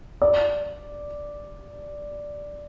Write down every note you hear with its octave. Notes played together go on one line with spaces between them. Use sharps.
D5